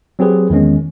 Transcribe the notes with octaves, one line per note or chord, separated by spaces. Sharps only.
F#3 C4 G4 G#4 B4
E2 D#3 G#3 C#4